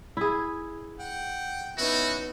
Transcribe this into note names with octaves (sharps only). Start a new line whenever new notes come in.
E4 G#4
F#5 G5
B3 C#4 D#4 E4 F#4